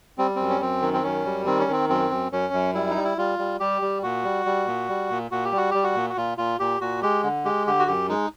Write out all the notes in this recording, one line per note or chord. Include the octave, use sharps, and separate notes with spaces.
G3 C4
F#2 C4
C#4
F#2 C4
D#3
C4
F#2 C#4
G3
D#3 C4
C#4
D#3 C4
F#2 C4
F#2
F#2 C#4
F#2
G3 E4
D#4
G3
E4
G3 F4
G3
G3 G4
G3
A#2 F#4
G3
G3
A#2
G3
A#2
A#2 F#4
G4
G3 F#4
G3 G4
F#4
A#2
F#4
A#2 F4
A#2 F4
A#2 G4
A#2 F#4
G#3 G4
D3
G#3 G4
D3 G4
F#4
F#2 G4
G#3 D#4